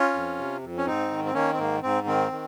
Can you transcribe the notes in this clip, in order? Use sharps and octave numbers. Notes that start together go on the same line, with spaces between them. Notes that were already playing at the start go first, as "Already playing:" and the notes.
Already playing: C#4 F4
F2
C3
F2
C#4
G#2 C4 D#4
D#3
C4
D#3 A#3 C#4
C4
G#2 A#3
G#2 C4
D#3 C4
D#3